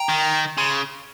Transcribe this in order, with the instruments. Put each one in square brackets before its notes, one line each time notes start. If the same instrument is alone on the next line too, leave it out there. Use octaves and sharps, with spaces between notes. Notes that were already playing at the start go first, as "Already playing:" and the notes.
Already playing: [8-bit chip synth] G5 A#5
[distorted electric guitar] D#3
[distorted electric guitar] C#3 [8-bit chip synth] C6